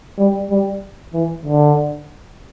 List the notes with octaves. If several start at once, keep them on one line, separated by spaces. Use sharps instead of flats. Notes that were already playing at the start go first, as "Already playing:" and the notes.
G3
G3
E3
D3